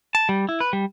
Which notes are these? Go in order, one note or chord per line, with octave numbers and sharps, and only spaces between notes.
A5
G3
E4
B4
G3